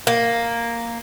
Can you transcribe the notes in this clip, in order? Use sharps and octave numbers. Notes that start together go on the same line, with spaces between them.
A#3